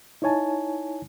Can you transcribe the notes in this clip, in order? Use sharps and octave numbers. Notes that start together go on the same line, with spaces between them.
D#4 E4 C#5 G#5 A5